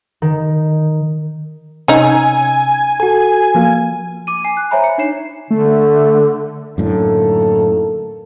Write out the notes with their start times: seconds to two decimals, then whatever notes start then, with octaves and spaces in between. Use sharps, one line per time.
0.22 D#3
1.88 C3 C#4 D#4 G#5 E6
3.00 F#4 A4 G#5
3.55 F3 A#3 F5
4.27 D6 D#7
4.44 G#5 C7
4.57 F#6
4.71 C5 C#5 E5 G#5 A#5 B5
4.84 C#7
4.98 D4 D#4 C#5 C7 E7
5.51 D3 A3
6.78 F#2 A2 D3 D#3 A#3 A4